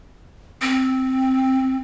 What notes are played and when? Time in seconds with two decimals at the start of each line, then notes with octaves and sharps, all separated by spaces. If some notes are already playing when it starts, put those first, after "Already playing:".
0.61 C4